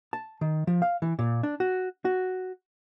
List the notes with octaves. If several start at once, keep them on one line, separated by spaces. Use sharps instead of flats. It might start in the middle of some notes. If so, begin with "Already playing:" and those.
A5
D#3
F3
F5
E3
A#2
D4
F#4
F#4